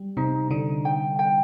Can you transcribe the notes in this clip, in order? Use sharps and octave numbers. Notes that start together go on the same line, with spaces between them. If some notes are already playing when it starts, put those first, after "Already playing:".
Already playing: G3
C3 D#4
D3 D#4
G5
G5